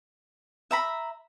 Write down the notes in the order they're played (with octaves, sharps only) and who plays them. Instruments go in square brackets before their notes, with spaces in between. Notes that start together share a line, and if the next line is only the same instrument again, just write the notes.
[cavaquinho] E5 A#5 B5